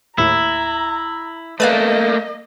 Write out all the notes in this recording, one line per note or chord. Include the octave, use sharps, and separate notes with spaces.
D#2 A2 E4 A#5
A3 A#3 B4 D5 D#5 F5